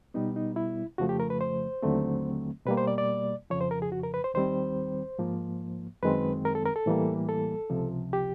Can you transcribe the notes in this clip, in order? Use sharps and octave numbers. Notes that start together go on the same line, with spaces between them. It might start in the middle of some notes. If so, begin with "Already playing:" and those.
B2 G3 B3 D#4
D#4
E4
F2 C#3 F3 A3 F#4
G4
A#4
B4
C5
D#2 D3 F#3 A3 C4
B2 G3 A#3 B4
C5
D5
D5
F2 C#3 F3 C#5
C5
A#4
G#4
F#4
A#4
B4
C5
D#2 D#3 G3 C4 C5
G#2 F3 A#3
F#2 D#3 G#3 C4 B4
A#4
A4
A#4
A4
A2 E3 G3 A#3
A4
C#2 C3 F3
G4